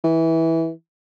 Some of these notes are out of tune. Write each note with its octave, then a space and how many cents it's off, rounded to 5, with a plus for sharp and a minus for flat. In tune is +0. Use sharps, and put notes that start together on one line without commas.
E3 -15